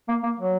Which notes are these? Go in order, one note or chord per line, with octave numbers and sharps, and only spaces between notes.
A#3
A#3
F#3